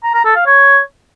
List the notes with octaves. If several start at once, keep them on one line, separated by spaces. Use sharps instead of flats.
A#5
A#5
A4
F5
C#5